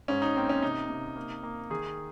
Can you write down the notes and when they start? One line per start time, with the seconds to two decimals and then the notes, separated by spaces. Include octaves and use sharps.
0.08 G#2 C#4
0.22 D#4
0.36 A#3 C4
0.49 C#4
0.62 C3 D#4
0.89 C3
1.16 A#3
1.43 A#3
1.70 D#3 G#4